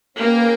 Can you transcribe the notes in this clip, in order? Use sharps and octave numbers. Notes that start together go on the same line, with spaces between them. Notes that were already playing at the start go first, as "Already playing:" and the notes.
A#3 C#4 G#4 B4 G5